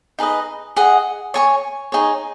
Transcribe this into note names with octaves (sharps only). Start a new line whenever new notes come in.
D#4 G#4 B4 D#5
G#4 D#5 F#5
C#5 G#5 C#6
D#4 G#4 C#5